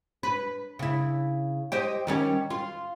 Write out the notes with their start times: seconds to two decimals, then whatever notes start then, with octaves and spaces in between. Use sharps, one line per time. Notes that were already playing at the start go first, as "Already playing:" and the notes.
0.23 B4
0.79 C#3 E4
1.72 G4 C5 D#5
2.07 D#3 G3 C#4
2.50 F4